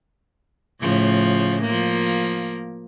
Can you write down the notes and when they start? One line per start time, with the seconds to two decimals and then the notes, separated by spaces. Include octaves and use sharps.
0.81 A2 C#3 F3
1.63 F3 A#3